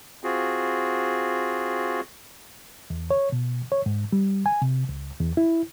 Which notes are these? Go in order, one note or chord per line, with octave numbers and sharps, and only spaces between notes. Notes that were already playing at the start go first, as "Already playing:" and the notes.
C4 F4 F#4 G#4
E2
C#5
B2
C#5
G#2
G3
G#5
C3
C#2
E2
E4